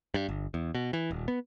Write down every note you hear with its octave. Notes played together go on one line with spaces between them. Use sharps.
G2
G1
E2
B2
E3
D#1
B3